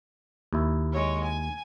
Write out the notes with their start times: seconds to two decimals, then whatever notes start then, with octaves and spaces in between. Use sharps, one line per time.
0.53 D#2 E4
0.93 G#3 C#5
1.25 G#5